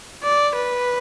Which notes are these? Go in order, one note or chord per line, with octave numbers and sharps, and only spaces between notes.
D5
B4